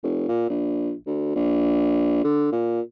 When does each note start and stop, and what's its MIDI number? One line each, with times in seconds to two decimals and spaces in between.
0.03 0.23 29
0.28 0.45 46
0.49 0.92 34
1.07 1.32 38
1.35 2.22 34
2.24 2.47 50
2.52 2.81 46